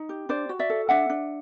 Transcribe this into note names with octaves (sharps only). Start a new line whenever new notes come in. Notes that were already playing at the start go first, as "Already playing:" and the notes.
Already playing: D#4
G4
D4 C5 D5
F#4
D5 E5
A4
D4 E5 F#5
D4